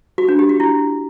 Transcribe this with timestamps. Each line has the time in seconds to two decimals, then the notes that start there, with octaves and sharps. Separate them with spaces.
0.18 F#4
0.28 D4
0.39 G4
0.49 F#4
0.60 E4